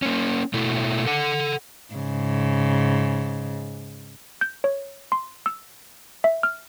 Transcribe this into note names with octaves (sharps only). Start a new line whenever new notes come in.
A#3 C#4
B2 A3 E4
A4 F#5
G#2 C#3
G6
C#5
C6
E6
E5
F6